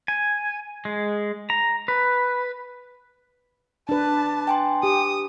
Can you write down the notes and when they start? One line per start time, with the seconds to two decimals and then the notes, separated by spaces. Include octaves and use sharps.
0.08 G#5
0.85 G#3
1.50 A#5
1.88 B4
3.89 D4 B4 A5
4.47 G5 G#5 C6
4.83 G4 D#6